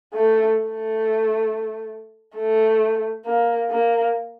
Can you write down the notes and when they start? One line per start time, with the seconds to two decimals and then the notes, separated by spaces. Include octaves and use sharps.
0.14 A3
0.59 A3
2.36 A3
3.25 A#3
3.70 A#3